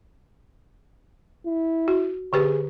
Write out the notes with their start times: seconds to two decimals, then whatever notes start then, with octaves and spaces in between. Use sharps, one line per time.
1.46 E4
1.88 F#4
2.33 D3 G4 G#4 B4